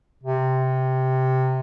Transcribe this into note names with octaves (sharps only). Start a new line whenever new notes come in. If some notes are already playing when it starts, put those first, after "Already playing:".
C3